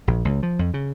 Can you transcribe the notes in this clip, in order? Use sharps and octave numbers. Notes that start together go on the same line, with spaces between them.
A#1
C#2
F3
F2
C#3